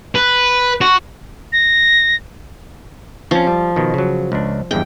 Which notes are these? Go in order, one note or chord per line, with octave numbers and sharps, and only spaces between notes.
B4
F#4
A#6
F3 C4 C#4
G3
B2 D#3
C#3 F#3
C#2 D4
E2 G2 G#3 G5